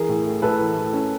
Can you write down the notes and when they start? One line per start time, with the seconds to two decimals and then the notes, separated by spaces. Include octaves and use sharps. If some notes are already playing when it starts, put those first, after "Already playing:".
Already playing: E3 G#4 A#4
0.08 A2
0.25 A3
0.42 A2 A4 B4
0.59 E3
0.77 A3
0.93 C#4